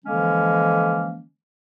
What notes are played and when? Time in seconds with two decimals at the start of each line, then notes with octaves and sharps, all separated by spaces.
0.05 D3 E3 F3 G#3 A#3 C#4